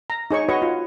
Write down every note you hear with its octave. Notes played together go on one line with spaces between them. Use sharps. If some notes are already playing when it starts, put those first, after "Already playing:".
A#5
D#4 G#4 C#5 C#6
F#4 B4 C#5 D#5 C#6
F4